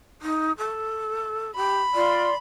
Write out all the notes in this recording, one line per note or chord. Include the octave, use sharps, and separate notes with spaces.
D#4
A4
G4 B5
F4 D5 C6